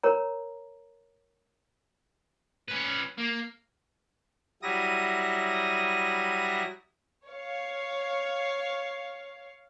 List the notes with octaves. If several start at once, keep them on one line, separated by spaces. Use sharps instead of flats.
A#4 C#5 A#5
C#4 B4
A#3
F#3 G3 E4 D#6 A#6
C#5 F5